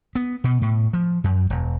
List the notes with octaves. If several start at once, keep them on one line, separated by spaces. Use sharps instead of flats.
B3
B2
A2
F3
F#2
E1